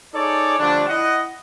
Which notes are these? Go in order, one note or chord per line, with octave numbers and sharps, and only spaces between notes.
D#4 G#4 A4 C#5 D5
D3 F3 G3 A3 D4
E4 D#5 F#5